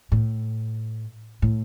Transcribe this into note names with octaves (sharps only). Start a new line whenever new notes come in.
A2
A2